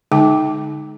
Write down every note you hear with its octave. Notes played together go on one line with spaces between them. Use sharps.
D3 G#3 D#4 G5 D6